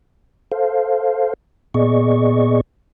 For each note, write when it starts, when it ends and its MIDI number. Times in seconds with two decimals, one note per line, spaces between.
0.52 1.33 69
0.52 1.33 72
0.52 1.33 77
1.74 2.61 46
1.74 2.61 59
1.74 2.61 68
1.74 2.61 74
1.74 2.61 75
1.74 2.61 85